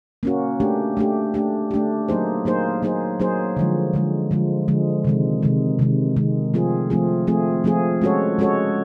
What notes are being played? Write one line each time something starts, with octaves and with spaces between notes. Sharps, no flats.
A#3 C#4 F#4
A3 D4 G4
A3 D4 G4
A3 D4 G4
A3 D4 G4
F#3 A#3 D#4 G#4 C5
F#3 A#3 D#4 G#4 C5
F#3 A#3 D#4 G#4 C5
F#3 A#3 D#4 G#4 C5
D3 F3 G#3
D3 F3 G#3
D3 F3 G#3
D3 F3 G#3
C3 D#3 G#3
C3 D#3 G#3
C3 D#3 G#3
C3 D#3 G#3
F3 A3 C4 F4 G#4
F3 A3 C4 F4 G#4
F3 A3 C4 F4 G#4
F3 A3 C4 F4 G#4
G#3 C#4 F#4 A4 C#5
G#3 C#4 F#4 A4 C#5